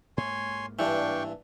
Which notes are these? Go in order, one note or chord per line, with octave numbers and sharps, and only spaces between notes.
G#2 A#3 C#5 G#5 C6
G2 E3 D4 G5 C#6